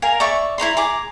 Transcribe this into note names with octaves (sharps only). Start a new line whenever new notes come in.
A#4 F5 G#5
D5 E5 C#6
E4 C5 A#5 C6
G#4 A#5 D6